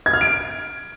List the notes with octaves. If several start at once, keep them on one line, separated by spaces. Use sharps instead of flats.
G#6
F6
D7